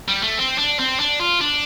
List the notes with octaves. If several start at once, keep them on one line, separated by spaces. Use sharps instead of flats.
G3
A3
C4
D4
C4
D4
F4
D4